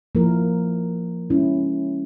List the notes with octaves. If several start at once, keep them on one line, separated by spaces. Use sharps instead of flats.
F3 A#3 E4 A#4
G#3 C#4 E4